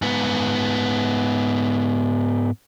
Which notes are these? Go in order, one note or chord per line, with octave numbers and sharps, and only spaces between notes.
G#2 B3